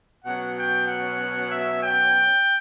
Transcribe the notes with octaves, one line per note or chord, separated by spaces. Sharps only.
B2 F#3 C#4 F#5
G5
F#5
E5
G5